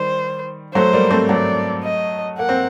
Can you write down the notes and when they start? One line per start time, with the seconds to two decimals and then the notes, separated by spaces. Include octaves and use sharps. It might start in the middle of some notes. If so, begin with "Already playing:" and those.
Already playing: D#3 G3 C5
0.75 F#3 A3 C5
0.93 G3 A#3
1.11 A3 C4
1.29 F#3 A3 D5
1.84 D#5
2.38 A#3 F#5
2.49 C4